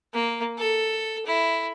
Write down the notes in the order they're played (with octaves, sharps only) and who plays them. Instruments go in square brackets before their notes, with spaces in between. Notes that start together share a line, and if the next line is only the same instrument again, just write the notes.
[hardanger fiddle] A#3
A4
E4